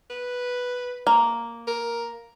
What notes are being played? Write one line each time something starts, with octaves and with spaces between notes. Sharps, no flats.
B4
A#3
A#4